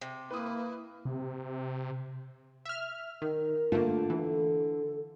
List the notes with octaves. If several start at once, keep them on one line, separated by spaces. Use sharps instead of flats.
C3
A#3 E4 B4 D#6
C3
E5 F6
D#3 A#4
D3 A3 A#3 F4 A5
E3 A4